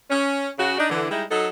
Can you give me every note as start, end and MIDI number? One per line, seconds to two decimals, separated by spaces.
0.10 0.49 61
0.59 0.78 49
0.59 0.78 66
0.79 0.86 62
0.79 0.86 63
0.90 1.08 50
0.90 1.08 52
1.11 1.24 55
1.11 1.24 56
1.11 1.24 63
1.11 1.24 64
1.31 1.47 54
1.31 1.47 63
1.31 1.47 69